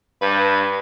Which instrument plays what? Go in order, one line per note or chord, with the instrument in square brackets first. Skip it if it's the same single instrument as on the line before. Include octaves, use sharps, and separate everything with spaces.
[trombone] G2 [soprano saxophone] B4